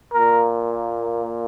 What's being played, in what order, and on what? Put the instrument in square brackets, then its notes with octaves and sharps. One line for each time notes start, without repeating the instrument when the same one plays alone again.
[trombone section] A#2 A#3 A#4